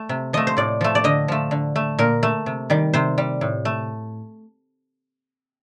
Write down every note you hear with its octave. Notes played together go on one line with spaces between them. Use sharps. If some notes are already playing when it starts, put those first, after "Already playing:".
Already playing: A3
C3
F3 A3 D#5
C5
A2 D5
F3 A3
D5
D3 D#5
F3 A3
D3
A3
A#2 A#4
A3
C3
D#3 G3
C3 C5
G3
A2
A3